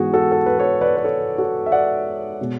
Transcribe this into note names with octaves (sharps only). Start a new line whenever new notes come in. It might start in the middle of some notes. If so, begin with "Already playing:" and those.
Already playing: G#2 E3 B3 F#4 G#4
F#4 A4
A4
B4
A4 C#5
B4 D5
B4
A4 C#5
F#4 A4
E5
D5 F#5
B2 G#3